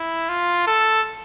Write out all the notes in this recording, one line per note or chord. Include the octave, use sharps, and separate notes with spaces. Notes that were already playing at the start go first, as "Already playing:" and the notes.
Already playing: E4
F4
A4